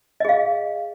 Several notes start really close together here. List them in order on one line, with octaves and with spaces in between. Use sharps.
D#5 G#4 F5